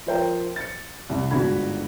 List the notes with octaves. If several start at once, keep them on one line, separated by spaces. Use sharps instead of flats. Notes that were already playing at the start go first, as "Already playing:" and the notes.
F3 A#4 C5 G5
A6 C#7
C2
G1 G#2 D4 F#4 B5 G#6